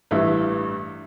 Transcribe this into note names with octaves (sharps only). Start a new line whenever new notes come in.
A1 G2 E3 E5